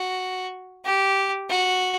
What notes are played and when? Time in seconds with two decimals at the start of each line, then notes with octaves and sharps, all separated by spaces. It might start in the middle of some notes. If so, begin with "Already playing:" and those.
Already playing: F#4
0.85 G4
1.49 F#4